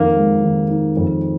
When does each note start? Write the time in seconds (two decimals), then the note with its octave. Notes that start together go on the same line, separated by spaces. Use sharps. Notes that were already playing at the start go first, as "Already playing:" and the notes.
Already playing: F2 D#3 A#3 D#4
0.15 G#3
0.43 D#3
0.70 D#4
0.97 F2